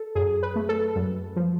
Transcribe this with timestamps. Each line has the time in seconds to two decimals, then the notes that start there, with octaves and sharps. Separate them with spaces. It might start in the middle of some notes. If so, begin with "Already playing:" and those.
Already playing: A4
0.15 F#2 G#4
0.43 B4
0.56 A3
0.69 A4
0.96 F#2
1.36 F3